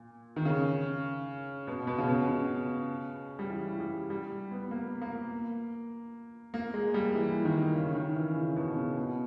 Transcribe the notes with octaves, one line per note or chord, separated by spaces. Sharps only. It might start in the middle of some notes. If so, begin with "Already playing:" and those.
Already playing: A#2
D#3
C#3
B2
B2
C#3
B2
C#3
G3
E3
G3
G3
B3
A#3
A#3
A#3
G#3
G3
E3
D#3
C#3
D#3
E3
C#3
B2
C#3
B2